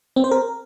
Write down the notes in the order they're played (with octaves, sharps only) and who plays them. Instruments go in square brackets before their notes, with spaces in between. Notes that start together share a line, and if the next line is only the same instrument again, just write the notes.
[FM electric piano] C4
C5
A#4